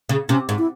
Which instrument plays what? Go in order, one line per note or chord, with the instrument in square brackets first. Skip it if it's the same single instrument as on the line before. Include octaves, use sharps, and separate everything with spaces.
[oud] C#3
[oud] C3 [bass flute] C#4
[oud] G#2
[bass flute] E4